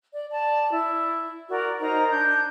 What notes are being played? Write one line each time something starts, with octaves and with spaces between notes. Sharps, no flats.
D5
D5 A5
E4
F#4 A#4 D5
D#4 A#4 C5 A#5
D4 G6